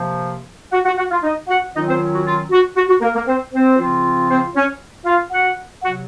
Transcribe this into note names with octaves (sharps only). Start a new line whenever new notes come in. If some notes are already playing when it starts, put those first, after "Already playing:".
Already playing: C3 F3 A#3
F#4 F#5
F#4 F#5
F#4 F#5
F4 F5
D#4 D#5
F#4 F#5
D#3 F#3 C#4 D#4 F4 D#5
C4 C5
F#4
F4
F#4
F#4
F#4
A#3 A#4
A#3 A#4
C4 C5
C4 C5
C#3 F3 C4 F4
C4 C5
C#4 C#5
F4 F5
F#4 F#5
C3 F#3 F#4 F#5